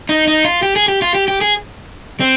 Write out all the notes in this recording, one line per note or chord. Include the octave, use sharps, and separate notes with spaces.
D#4
D#4
F4
G4
G#4
G4
F4
G4
G4
G#4
C4